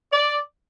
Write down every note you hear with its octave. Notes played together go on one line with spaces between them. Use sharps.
D5